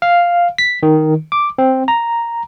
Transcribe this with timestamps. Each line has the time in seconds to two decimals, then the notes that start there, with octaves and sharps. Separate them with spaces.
0.02 F5
0.58 B6
0.83 D#3
1.32 D6
1.58 C4
1.88 A#5